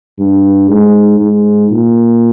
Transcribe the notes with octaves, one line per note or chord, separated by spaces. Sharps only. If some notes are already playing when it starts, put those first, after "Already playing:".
G2
G#2
G#2
A#2